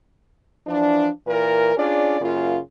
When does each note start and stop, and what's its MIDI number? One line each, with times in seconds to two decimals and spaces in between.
0.67 1.08 52
0.67 1.08 53
0.67 1.08 62
1.27 1.75 46
1.27 1.75 52
1.27 1.75 70
1.77 2.18 61
1.77 2.18 62
1.77 2.18 65
1.77 2.18 68
1.77 2.18 74
2.20 2.58 42
2.20 2.58 49
2.20 2.58 58
2.20 2.58 65